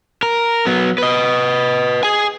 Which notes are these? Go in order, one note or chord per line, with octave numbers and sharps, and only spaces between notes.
A#4
F#3 B3
B4 D#5
G#4 G#5